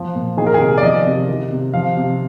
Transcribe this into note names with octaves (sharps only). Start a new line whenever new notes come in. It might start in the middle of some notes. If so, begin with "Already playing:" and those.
Already playing: F3
A#2
D#3 G#4
A#4
G#4
C3
D5
F3 D#5
C3
D#3
C3
F3 F5
C3